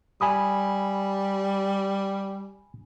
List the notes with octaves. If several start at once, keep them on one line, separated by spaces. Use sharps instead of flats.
G3 G#5 B5 D#6